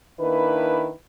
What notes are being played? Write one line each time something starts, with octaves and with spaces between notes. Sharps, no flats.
D#3 A#3 D4 E4 B4